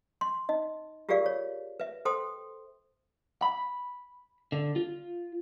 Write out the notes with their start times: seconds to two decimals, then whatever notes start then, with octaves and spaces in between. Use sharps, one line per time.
0.21 C6
0.49 D#4 D#5
1.09 F4 G4 G#4 A#4 D5 F5
1.26 C#5
1.80 B4 E5
2.05 A4 C5 G5 C6 D#6
3.42 B5
4.52 D3
4.76 F4